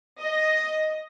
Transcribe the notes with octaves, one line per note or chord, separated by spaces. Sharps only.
D#5